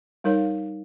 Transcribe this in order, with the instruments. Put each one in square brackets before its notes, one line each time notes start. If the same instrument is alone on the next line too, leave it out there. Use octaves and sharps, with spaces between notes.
[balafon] G3 D#4 A#4 C#5 F5